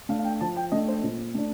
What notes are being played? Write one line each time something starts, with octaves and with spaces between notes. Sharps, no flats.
A3 D4 F5
F5
G5
F3 A5
G5
A3 D4 D#5
C5
A#2
A3 D4